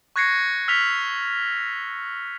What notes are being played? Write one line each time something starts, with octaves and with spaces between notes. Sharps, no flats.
C#6 F#6 G#6 A#6 C7 C#7
E6 F6 B6 F7